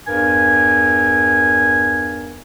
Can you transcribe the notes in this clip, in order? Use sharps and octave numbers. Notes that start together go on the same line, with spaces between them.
E2 G2 A#4 G#5